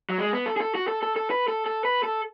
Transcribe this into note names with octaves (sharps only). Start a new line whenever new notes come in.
F#3
G#3
B3
A4
G#4
A4
F#4
A4
A4
A4
B4
A4
A4
B4
A4